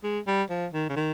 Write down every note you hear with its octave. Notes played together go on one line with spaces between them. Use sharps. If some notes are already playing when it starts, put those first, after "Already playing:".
G#3
G3
F3
D#3
C#3
D#3